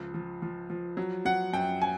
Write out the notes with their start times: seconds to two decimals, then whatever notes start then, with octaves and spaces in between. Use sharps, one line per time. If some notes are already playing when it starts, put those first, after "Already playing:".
Already playing: C#2 F3
0.14 F3
0.42 F3
0.70 F3
0.97 F#3
1.25 F#3 F#5
1.53 F#2 G5
1.82 G#5